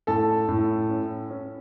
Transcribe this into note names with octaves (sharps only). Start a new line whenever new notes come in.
A2 A4 A5
A2
C#4
C#4